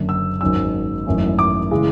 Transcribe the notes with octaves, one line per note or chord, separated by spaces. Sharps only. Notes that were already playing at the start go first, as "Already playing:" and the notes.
Already playing: F#1 F#2 D3
E6
G#1 G#2 F#3 C#4 E6
G#1 F#2 E3 A3 C#4
D6
C#3 E3 G#3